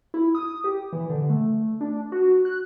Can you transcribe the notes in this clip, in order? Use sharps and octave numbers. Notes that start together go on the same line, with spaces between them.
E4
D#6
G4
E3
D3
A3
D4
F#4
F#6